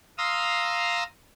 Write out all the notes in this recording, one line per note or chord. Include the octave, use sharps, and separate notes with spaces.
F5 A#5 C6 D#6 E6